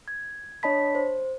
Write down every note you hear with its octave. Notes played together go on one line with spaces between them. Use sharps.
G#6
D4 C#5 D#5 A5 B5 B6
C5